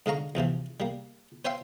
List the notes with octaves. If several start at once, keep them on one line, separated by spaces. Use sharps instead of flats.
G#2 D3 F5 A#5 C#6
E2 C3 E3 F3
G3 A#3
C5 C#5 E5 F5 G5 C6